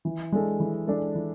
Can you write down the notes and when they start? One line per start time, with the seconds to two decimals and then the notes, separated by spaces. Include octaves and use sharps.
0.05 E3
0.32 G#3 D4 A4
0.60 E3
0.88 G#3 D4 A4
1.15 E3